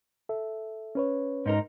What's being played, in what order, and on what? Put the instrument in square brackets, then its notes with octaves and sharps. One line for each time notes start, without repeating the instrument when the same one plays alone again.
[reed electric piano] A4 E5
C#4 B4 C#5
[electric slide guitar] G#2 D#4 A#4